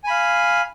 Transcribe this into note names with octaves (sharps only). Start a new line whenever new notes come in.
F5 G#5 B5